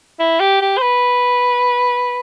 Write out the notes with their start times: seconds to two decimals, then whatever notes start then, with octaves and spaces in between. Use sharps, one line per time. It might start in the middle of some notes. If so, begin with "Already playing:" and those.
0.20 E4
0.40 G4
0.61 G4
0.78 C5
0.82 B4